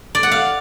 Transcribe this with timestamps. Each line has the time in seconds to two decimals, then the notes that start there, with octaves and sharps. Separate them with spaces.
0.15 D5
0.23 F#5
0.31 F5